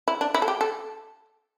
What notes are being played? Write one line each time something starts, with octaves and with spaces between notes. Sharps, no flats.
E4
D4
E4
A4
G4
A4